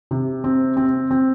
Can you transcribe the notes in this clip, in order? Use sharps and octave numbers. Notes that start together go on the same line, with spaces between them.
C3
C4
C4
C4